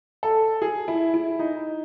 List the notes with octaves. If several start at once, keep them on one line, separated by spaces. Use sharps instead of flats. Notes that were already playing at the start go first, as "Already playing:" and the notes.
A4
G#4
E4
E4
D#4